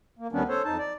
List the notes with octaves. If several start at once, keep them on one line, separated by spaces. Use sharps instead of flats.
A#3
D2 D#3 G3 B3 C#4 D4
A4 C5 C#5
F2 D#4 A5
D5